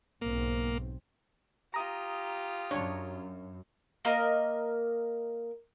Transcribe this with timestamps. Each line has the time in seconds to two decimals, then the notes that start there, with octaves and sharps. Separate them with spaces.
0.21 B1 G#2 A#3 C4
1.74 F4 G4 A#5 D#6
2.71 F#2 D4 C#5
4.05 A#3 A#4 D#5